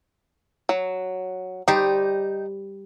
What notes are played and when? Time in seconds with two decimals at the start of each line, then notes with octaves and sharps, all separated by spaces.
0.69 F#3
1.68 G3 D#4 G4 C5